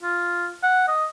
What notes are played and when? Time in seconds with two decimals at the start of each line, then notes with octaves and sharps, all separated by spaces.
0.03 F4
0.63 F#5
0.88 D#5